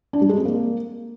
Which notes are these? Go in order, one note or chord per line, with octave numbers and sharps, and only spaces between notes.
D4
G3
G#3
C4
A#3